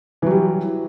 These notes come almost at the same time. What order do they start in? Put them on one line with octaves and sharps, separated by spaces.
E3 F#3 G3